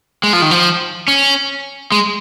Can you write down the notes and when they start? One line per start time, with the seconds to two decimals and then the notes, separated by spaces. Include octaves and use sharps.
0.23 G#3
0.33 F3
0.42 D#3
0.51 F3
1.08 C#4
1.92 G#3